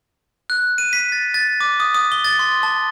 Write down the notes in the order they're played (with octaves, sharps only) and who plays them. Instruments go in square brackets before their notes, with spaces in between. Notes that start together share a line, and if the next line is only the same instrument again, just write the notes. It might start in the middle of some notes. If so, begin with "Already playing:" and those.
[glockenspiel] F#6
D#7
B6
A6
A6
D6
D#6
D#6
G7
A6
C6
A5